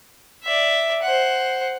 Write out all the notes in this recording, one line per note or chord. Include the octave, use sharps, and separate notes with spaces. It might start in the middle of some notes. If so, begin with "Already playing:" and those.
D5 E5
C5 F#5